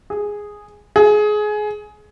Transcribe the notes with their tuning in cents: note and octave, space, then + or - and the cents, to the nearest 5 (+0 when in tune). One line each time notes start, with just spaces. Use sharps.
G#4 -5
G#4 +20